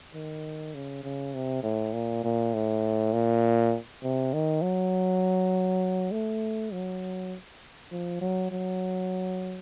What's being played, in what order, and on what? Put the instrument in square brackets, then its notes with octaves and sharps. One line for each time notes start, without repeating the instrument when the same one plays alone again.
[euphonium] D#3
C#3
C#3
C3
A2
A#2
A#2
A2
A#2
C3
D#3
F#3
A3
F#3
F3
F#3
F#3